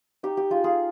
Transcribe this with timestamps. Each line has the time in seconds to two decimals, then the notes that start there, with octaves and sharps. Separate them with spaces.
0.23 D#4 G4
0.37 G4
0.50 D#4 F4 G#4
0.64 F4 G#4